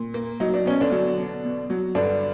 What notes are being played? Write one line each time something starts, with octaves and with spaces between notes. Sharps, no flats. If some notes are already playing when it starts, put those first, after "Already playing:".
Already playing: A#2
A#3
F#3 D#4
D4
B2 C#4
D3 D4
F#3
B2
B2
F#3
G2 D3 D4